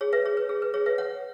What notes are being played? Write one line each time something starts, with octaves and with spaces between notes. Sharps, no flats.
G#4 C#5
B4 E5
G#4 C#5
B4
G#4
B4
G#4 C#5
B4 E5
C#5 F#5